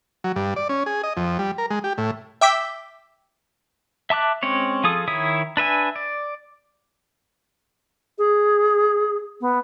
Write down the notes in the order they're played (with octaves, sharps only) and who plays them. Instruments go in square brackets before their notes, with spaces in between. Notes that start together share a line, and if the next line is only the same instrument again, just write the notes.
[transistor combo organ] F#3
G2
D5
C#4
G#4
D#5
F2
G3
A#4
G#3
G4
A2
[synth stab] E5 G5 D6 E6 B6
[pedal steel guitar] E5 A5 D6 F#6
G#3 C4 C#4 C#5
F3 F4 G#4 A4 D#6
D#3 E4 C#5 E5 D#6
D4 B4 E5 G#5
D5
[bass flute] G#4
B3